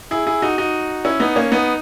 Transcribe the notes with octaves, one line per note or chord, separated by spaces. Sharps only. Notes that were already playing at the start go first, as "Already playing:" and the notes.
E4 G#4
E4 G#4
D#4 F#4
D#4 F#4
C#4 E4
B3 D#4
A#3 C#4
B3 D#4